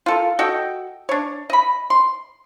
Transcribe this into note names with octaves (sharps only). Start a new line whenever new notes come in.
F4 A4 A#4
F#4 A4 D#5 G5
D4 C#5
D#5 B5
C6